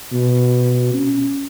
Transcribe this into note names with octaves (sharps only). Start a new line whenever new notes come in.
B2
C#4